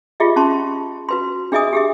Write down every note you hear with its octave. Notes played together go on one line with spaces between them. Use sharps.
F4 G4 G#4 D#5 E5
C#4 A5 C6 C#6
F#4 B4 C6
D4 G#4 D#5 E5 G#5 D#6
G4 G#4 E5